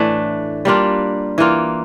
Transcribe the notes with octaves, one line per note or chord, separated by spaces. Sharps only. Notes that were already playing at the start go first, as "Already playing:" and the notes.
Already playing: A2 E3 A3 D4
G3 A#3 D4 F4
E3 A#3 F4